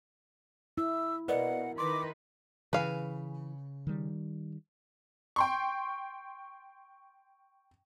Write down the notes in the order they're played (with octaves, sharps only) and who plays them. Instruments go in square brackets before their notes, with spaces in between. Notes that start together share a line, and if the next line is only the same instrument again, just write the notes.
[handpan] E4 [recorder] E6
[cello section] B2 [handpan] A#4 [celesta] B4 D5 D#5 [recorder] F#5
[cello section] D#3 D#4 B4 [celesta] C6 [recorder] D6
[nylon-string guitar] C#3 G#5 [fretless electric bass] E3 [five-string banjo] B4 F5
[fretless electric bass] D#3 G3
[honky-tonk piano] G5 C6 C#6